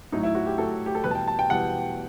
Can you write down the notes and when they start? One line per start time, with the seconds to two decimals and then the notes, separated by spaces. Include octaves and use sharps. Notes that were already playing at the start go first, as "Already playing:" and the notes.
0.12 A2 F#3 D#4
0.23 E4
0.35 F#4
0.46 G4
0.58 A2 F#3 A4
0.86 G4
0.95 A4
1.04 E2 B2 G3 B4
1.11 A5
1.15 G5
1.28 A5
1.39 G5
1.50 E2 B2 G3 F#5